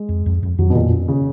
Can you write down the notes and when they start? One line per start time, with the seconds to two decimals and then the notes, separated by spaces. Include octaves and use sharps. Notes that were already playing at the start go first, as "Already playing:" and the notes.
Already playing: G#3
0.09 F2
0.26 F2
0.43 F2
0.58 F2 F#3
0.70 B2
0.75 F2 A#2
0.92 C#4
1.08 C#3